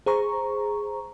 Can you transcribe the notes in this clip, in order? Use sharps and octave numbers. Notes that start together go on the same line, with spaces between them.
G#4 C5 A#5 C#6